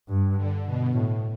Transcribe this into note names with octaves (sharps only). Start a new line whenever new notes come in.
G2
D3
B2
A2